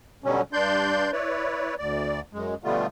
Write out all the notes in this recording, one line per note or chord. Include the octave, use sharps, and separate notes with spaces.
B2 D3 F#3 G3 C#4
G2 D4 D5 C6 G6
E4 B4 C#5 D5
D2 D5
F#2 G#3
B2 D3 G3 A3 B3 F4